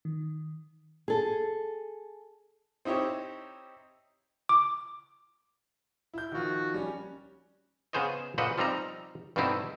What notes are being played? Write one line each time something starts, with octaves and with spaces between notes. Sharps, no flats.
D#3
G#4 A4
C4 D#4 E4 G4 C#5
D6
E4 G6
D#3 F3 F#4
G3 C#4
C#3 B3 G#4 C5 C#5 D#5
A#2 C#3 B4 C5 D#5 F#5
F3 G3 C4 D#4 A#5
G2 B2 A3 C4 D#4 E4